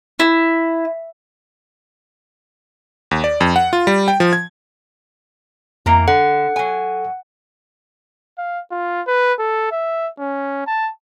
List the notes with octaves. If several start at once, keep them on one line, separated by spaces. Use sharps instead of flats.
E4
D#2
D5
F2
F#5
F4
G3
G5
F3
G#6
F2 E3 A#3 A#5
D3 A4 F#5
F#3 G#5
F5
F4
B4
A4
E5
C#4
A5